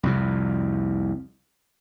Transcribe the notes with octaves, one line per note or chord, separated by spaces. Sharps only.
C2 F2 C3